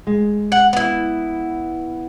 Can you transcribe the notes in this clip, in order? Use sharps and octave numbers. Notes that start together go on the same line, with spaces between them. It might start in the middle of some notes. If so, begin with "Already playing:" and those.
G#3
F#5
B3 E4